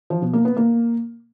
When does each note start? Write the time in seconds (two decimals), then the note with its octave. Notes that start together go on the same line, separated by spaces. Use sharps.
0.10 F3
0.22 B2
0.33 A#3
0.45 B3
0.57 A#3